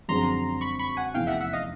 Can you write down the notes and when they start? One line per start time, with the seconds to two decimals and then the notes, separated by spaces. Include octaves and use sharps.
0.09 F#2 D3 F3 G#3 C4 A#5 C6
0.61 B5 C#6
0.79 B5 C#6
0.97 F#5 G#5
1.14 F1 E2 C#3 F5 G5
1.27 E5 F#5
1.41 E5 F#5
1.53 D#5 F5